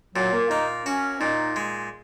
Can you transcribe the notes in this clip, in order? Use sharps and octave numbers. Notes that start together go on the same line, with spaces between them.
A#2 F#3
A#3
A#3 D#4
C#4 F#4
A#2 D#4
G#3